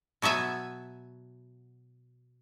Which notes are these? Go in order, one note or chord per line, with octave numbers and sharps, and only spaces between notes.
B2 F#3 B3 E5 G#5